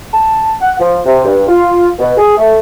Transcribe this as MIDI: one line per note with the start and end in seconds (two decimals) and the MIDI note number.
0.14 0.51 81
0.61 0.75 78
0.79 0.99 53
1.05 1.23 48
1.25 1.48 43
1.49 1.87 65
1.99 2.16 47
2.18 2.36 68
2.38 2.57 57